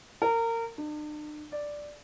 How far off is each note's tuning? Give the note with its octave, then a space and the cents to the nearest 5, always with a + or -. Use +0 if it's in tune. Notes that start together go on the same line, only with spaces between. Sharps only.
A#4 -25
D4 +45
D5 +0